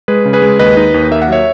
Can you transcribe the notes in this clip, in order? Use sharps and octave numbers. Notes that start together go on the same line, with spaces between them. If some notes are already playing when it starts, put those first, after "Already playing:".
G#3 G#4 B4
C#3
G#4 B4
G#3
D#2 B4 D#5
D#4
D#2
A#3 E5
F#5
F#3 C#5 E5